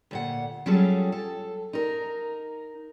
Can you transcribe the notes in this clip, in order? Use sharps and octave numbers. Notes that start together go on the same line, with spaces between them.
D2 A#2 F#5
F#3 G3 C#4 F4 G#4 A4
A4
D#4 A#4